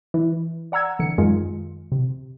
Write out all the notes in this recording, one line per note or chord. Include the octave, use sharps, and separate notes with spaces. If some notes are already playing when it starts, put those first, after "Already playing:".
E3
D5 F#5 A#5 E6 G#6
D3 E3 C#7
F#2 D#3 G#3 F4
C3